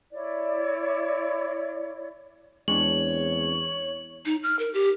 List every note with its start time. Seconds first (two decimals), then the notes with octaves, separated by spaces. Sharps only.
0.12 E4 C#5 D5
2.68 E2 G#3 C4 D4 C#5 F#7
4.26 D#4
4.43 F6
4.59 A#4
4.74 G4